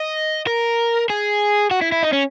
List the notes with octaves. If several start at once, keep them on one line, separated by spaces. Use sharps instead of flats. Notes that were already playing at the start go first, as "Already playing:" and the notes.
Already playing: D#5
A#4
G#4
F#4
E4
E4
D#4
C#4